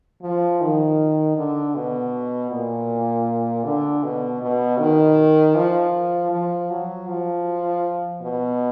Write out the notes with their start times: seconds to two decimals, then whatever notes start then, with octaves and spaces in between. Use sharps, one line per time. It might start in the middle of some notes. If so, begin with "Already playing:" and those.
0.22 F3
0.61 D#3
1.36 D3
1.75 B2
2.51 A#2
3.65 D3
4.04 B2
4.42 B2
4.80 D#3
5.55 F3
6.31 F3
6.70 F#3
7.08 F3
8.22 B2